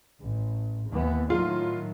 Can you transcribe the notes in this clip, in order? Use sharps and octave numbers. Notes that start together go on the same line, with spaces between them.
A1
D#2 E3 B3
A2 D#3 F#3 F4